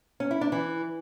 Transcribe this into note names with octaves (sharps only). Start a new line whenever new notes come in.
C#4
E4
D4
E3